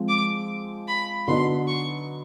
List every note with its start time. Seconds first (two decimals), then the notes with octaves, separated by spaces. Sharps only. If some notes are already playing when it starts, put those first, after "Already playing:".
Already playing: F3 G#3 C4
0.09 D6
0.88 B5
1.28 D3 F#3 B3 D#4 C6
1.68 C#6